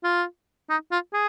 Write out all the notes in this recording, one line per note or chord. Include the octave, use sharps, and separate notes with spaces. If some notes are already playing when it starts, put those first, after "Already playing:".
F4
D#4
F4
G#4